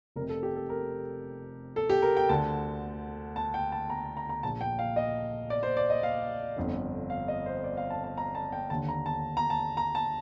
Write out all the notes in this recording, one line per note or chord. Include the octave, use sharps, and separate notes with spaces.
F1 F2 C3 A#4
A4
G4
A4
A#4
A4
G4
A#4
G5
D2 D3 A5
A5
G5
A5
A#5
A5
A#5
A#5
A#1 A#2 A5
G5
F5
D#5
D5
C5
D5
D#5
F5
G1 F2 D3
F5
D#5
C5
D5
F5
A5
A5
A#5
A5
G5
D#2 D3 A5
A#5
A5
A#5
A5
A#5
A5